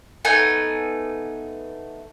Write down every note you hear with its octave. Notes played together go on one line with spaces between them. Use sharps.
A3 B3 D#4 G#5